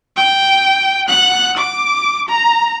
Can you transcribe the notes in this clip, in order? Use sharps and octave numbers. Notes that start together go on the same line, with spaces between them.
G5
F#5 F#6
D6
A#5